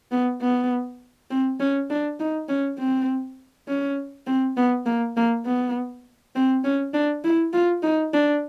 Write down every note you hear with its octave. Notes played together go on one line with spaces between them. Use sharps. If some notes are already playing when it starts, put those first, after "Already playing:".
B3
B3
C4
C#4
D4
D#4
C#4
C4
C#4
C4
B3
A#3
A#3
B3
C4
C#4
D4
E4
F4
D#4
D4